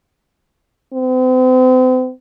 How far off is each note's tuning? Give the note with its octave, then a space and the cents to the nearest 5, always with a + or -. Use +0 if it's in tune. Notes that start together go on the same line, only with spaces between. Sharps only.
C4 -40